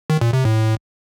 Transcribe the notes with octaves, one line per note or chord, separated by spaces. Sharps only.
D#3
A#2
C3
A2